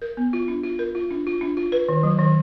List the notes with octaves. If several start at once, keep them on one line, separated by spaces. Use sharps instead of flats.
A#4
B3
F4
D4
F4
A#4
F4
D4
F4
D4
F4
B4
D#3
F#3
D#3